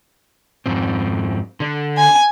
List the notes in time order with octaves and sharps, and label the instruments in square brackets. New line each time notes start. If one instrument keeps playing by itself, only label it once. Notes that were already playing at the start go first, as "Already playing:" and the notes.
[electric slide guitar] F2 G#2 C4
D3 D4
[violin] G#5